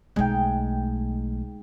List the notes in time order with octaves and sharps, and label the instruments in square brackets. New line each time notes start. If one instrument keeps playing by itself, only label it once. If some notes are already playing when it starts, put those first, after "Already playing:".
[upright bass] B1 A3 [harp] G#3 D#4 G5